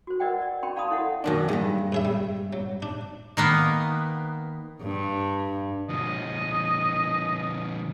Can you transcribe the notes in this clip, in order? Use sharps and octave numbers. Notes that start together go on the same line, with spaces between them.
F#4 C5
A#4 B4 D5 D#5 F#5 G5
D5
C#4 G5 B5 C6
D5 F5 A5 B5 C6 D#6
E4 A4 C#5 E5 F#5
F#2 D#3 D4
E2 G2 G#3
F#2 G#4 E5
G3
F#3
D4
D#3 A#3 B3
G2
D3 F3 D#5